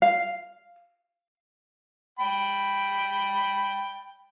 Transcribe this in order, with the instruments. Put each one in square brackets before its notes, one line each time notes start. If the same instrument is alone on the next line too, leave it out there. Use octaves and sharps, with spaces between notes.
[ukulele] F5
[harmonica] G5 B5